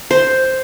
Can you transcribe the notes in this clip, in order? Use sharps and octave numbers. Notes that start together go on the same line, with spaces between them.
C5